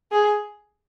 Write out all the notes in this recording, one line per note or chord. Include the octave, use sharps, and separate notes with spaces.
G#4